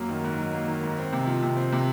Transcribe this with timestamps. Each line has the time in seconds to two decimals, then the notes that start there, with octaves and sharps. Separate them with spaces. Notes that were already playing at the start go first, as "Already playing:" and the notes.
Already playing: F#2 F#3 A#3
0.09 D#3
0.24 G#2
0.38 F#3
0.53 A#3
0.68 D#3
0.83 G#2
0.98 C4
1.12 C3
1.27 F3
1.43 C3
1.57 C4
1.72 C3